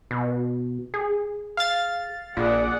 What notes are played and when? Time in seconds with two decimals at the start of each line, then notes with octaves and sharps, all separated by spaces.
0.11 B2
0.94 G#4
1.57 F5 A6
2.37 A#1 A#2 G#4 D5 F#5